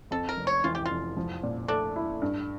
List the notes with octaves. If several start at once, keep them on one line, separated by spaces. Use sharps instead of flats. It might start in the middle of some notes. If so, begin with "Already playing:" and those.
F2 A4
A#4
F1
C#5
E3 F4
G4
F1 F4
F3
A#2
A3 D4
E4
G2